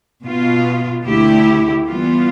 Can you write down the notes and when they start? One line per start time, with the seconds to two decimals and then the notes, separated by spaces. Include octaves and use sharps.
0.23 B2 B3 F4
1.05 D2 D3 A3 E4 G4
1.87 E3 G3 B3 F4